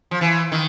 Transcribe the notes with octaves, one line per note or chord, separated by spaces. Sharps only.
F3
E3
D#3